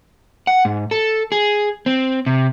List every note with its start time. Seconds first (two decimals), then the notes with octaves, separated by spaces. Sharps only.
0.47 F#5
0.65 G#2
0.91 A4
1.32 G#4
1.86 C4
2.26 C3